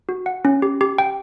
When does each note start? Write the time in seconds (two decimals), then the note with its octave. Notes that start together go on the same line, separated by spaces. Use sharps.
0.09 F#4
0.26 F#5
0.45 C#4
0.62 G4
0.81 G4
0.98 G5